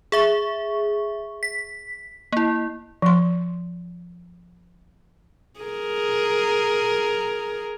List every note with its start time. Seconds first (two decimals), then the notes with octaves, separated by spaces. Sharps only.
0.12 G#4 E5 C#6
1.43 B6
2.32 A#3 E4
3.02 F3 C6
5.60 G#4 A#4